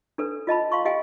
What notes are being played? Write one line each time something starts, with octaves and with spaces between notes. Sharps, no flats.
D4 A4 B4
F4 D#5 A5 B5
F5 C6 C#6
G4 D#5 F5 G5 G#5